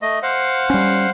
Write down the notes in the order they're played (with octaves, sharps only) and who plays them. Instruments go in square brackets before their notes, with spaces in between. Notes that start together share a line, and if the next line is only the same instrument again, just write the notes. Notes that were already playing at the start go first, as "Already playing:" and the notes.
[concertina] A3 D#5
C5 F5 F#5
[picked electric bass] G3 C#4